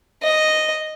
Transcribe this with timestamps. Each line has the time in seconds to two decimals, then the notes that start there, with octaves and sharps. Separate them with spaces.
0.22 D#5